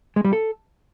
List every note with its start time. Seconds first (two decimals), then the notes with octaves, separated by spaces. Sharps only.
0.16 G#3
0.25 G3
0.33 A4